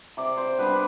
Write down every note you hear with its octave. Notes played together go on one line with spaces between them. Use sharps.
C3 D5
C5
G3 B3 D4 B4